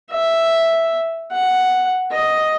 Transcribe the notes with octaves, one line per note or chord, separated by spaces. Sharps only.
E5
F#5
D#5